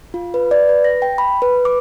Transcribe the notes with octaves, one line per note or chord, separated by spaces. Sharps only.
F4
B4
D5
B4
A#6
G5
B5
B4
D6